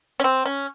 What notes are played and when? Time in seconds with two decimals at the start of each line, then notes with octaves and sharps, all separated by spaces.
0.20 C#4
0.24 C4
0.46 C#4